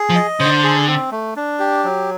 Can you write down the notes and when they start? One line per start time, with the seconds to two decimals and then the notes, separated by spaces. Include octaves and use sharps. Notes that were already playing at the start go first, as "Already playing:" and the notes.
Already playing: G#4
0.09 F3
0.15 D#5
0.40 C#3 C5
0.45 D3
0.64 G#4
0.88 C4
1.12 A3
1.37 D4
1.60 G4
1.84 F#3